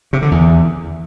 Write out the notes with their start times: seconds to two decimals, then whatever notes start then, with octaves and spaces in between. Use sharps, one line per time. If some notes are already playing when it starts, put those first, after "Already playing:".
0.13 C3
0.22 D3
0.31 E2